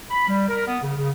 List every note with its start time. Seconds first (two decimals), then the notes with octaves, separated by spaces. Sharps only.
0.11 B5
0.28 G3
0.49 A#4
0.67 B3
0.83 C#3
0.96 C#3